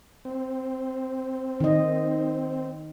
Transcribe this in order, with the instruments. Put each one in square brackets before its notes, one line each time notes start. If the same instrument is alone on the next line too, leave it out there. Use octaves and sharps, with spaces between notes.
[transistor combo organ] C4
[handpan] D#3 D#5